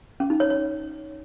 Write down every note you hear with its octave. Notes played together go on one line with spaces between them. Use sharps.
C#4
D#4
C#5
C#5